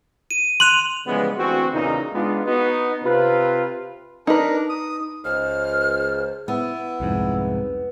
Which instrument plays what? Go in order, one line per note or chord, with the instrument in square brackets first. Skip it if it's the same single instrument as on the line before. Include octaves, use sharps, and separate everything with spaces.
[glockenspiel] D#7
[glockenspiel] C6 D#7 F7 [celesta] F#6 F#7
[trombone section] C#3 E3 F3 G3 G#3 B3
D2 E3 C4 F#4
E2 A#2 C#3 D#4
G#3 B3 D4 D#4 F4
B3 D#4 F#4
C3 F4 B4
[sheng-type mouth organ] D4 A#4 [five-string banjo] D#4 B4
[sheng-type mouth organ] D#6
[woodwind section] C#2 [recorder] C5 [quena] F6
[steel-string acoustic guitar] B3 [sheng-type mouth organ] E4
[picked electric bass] C2 F2 G#2